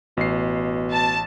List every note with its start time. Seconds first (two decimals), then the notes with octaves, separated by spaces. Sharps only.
0.17 A1 B2 C7
0.92 A5